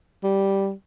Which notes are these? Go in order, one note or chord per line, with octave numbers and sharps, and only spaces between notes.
G3